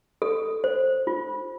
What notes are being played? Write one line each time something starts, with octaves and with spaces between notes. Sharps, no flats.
A4
C5
F4